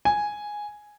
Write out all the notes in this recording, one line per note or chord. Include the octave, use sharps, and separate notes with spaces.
G#5